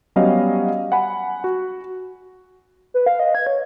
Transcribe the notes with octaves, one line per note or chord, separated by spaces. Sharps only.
F#3 G3 B3 C#4 D#5 F5
F#5 G#5 B5
F#4
B4
F5
D#5
G#6
C#5